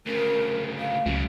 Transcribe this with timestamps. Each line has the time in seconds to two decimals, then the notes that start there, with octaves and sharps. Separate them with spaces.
0.06 D2 C#3 A#4
0.79 F5
1.06 C#2 F#2 C#3